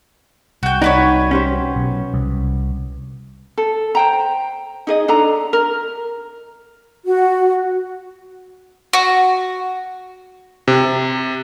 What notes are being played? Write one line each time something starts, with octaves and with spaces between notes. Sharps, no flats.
C2 F#4 G5
D#4 F#4 B4 C#5 D5
C#4 G4 C5
B1
C2
A4
C5 G5 A#5
D#4 G#4 D#5
D4 A4 A#5
A#4
F#4
F#4
C3